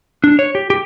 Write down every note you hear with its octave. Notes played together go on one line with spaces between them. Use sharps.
D4
C#5
G4
G4